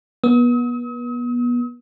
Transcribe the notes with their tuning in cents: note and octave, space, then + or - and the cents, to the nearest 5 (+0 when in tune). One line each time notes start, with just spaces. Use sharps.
B3 -30 D#6 +45